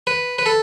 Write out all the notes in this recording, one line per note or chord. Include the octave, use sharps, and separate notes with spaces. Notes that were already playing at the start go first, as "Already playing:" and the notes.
B4
B4
A4